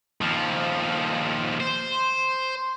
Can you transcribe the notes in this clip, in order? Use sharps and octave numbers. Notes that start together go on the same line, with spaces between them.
D#2 F3
C5